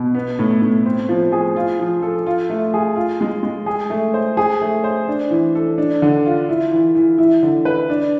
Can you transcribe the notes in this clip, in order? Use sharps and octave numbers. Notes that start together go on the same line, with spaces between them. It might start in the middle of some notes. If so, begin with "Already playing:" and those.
Already playing: B2
B3
A2
A2
C4
F3
G#4
F4
F3
A4
F4
A3
G#4
F4
G#3
G#3
G#4
A3
C5
G#4
A3
C5
D4
E3
A4
D4
D3
F4
E4
E3
E3
E4
D3
B4
D4